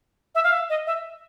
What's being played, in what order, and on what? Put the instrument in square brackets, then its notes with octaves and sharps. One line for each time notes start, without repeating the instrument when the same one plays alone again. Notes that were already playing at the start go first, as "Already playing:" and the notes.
[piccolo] E5
F5
E5
D#5
E5